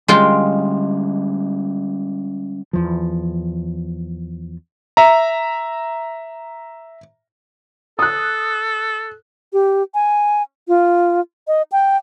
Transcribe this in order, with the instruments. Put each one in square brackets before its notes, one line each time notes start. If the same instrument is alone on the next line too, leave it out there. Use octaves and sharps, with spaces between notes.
[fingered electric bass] D3 G3 C#4 [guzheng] G#3 F4 G5
[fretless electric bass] E2 F3
[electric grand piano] E5 A#5
[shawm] A4 [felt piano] D#6 F#6
[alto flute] G4
G#5
F4
D#5
G5